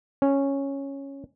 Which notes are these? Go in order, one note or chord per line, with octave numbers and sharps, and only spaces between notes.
C#4